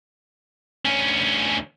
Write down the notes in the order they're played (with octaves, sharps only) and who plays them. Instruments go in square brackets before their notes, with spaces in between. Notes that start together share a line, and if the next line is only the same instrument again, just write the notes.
[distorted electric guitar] D2 C#4